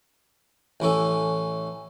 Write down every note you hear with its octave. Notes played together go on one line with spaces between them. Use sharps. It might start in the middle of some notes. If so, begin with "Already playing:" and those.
A1 E3 C#4 A4